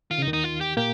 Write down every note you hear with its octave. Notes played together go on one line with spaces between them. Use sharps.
D#3 F4
C#3
D#4
D#2 D#3
D#4
F4
G4
A#2 A#3 G4